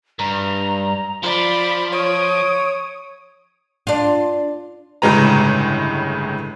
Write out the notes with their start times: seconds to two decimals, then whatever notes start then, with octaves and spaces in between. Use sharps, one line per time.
0.19 G2 A#5
1.23 F3 D5 B5
1.93 C#5 D#6 D7
3.87 D4 F4
5.02 G1 A2 C#3 G#3 B4 A#5